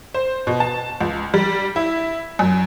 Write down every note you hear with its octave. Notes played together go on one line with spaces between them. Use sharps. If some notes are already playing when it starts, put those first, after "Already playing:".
C5
B2
A5
C#2
G3
E4
F#2